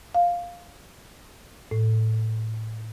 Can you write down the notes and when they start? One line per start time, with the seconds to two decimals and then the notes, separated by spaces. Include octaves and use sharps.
0.14 F5
1.71 A2